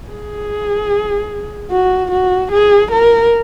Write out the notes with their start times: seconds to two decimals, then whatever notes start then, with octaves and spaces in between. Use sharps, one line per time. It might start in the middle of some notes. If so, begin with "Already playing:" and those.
0.10 G#4
1.71 F#4
2.12 F#4
2.52 G#4
2.92 A#4